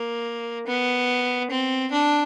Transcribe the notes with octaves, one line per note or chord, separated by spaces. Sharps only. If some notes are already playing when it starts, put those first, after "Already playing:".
Already playing: A#3
B3
C4
D4